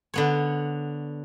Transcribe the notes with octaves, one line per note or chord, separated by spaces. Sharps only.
D3 B3 C#5